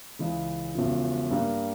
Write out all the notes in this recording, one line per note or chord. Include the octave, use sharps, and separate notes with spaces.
C#2 C#3 E3 G#3
E1 E2 C#3 F3
G2 G3 A#3